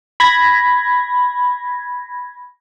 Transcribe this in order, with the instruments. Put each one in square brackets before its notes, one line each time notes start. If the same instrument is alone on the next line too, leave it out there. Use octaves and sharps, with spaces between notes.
[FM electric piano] B5 G#6 A#6